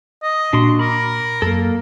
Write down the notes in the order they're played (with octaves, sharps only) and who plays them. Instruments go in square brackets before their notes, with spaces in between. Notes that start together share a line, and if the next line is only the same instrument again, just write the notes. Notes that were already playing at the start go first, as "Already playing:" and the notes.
[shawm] D#5
[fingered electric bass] A#2 [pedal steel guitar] D4 F#4 C6
[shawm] A#4 [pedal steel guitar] B5 D6
[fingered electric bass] F#2 [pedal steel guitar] A#3 A4